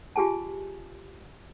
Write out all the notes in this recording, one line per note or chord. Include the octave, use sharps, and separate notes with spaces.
F4 G4 G#4 G#5 A5